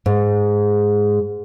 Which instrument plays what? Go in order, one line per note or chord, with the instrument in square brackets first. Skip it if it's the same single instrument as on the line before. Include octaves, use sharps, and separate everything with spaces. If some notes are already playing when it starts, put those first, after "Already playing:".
[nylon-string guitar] G#2